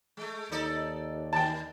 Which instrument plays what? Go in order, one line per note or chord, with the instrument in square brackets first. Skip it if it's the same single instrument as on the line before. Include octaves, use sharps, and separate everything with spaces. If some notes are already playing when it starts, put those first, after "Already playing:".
[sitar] G#3 A3
[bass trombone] D#2 [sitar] D#4 A4 D5
[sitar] D#3 [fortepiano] G5 A5